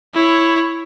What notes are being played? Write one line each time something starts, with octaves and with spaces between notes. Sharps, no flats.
E4 C#5